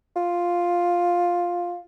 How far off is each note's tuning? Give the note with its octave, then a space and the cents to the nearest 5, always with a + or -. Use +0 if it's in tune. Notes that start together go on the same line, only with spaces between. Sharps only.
F4 +5